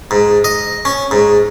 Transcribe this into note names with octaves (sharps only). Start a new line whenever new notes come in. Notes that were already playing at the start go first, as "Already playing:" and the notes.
G#2
D#5
C#4
G#2